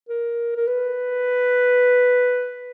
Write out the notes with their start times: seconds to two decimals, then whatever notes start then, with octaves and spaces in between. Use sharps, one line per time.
0.09 A#4
0.56 A#4
0.67 B4